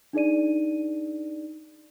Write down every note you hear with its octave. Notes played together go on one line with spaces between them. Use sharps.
D4 D#4 G#4 D5 D#7